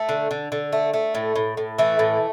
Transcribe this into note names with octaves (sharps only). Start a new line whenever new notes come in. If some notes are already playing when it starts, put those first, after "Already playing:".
Already playing: A3
D3
D3
D3
A3
A3
A2
A2
A2
E3 A3
A2